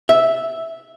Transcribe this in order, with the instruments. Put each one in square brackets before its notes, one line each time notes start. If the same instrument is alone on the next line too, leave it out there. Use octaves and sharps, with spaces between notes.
[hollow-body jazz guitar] E5